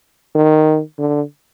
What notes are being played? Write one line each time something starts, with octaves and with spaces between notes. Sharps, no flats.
D#3
D3